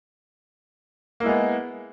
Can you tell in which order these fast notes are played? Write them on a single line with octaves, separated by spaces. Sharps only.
A#3 E4 G#3 B3